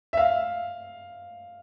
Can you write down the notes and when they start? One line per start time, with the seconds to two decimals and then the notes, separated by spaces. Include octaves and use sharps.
0.13 E5
0.17 F5